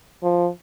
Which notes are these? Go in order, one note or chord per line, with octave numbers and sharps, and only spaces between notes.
F3